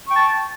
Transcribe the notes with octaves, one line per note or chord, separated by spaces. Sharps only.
G5 A5 C#6